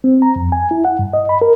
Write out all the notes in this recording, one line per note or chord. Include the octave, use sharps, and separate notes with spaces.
C4
A#5
F2
G#5
E4
F#5
G2
D#5
B5
A#4